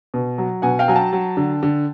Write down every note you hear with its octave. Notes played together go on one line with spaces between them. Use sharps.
B2
F#3
B2 F#5 G#5
F5 G5
F#3 G#5
G5 A5
F#3
D3
D3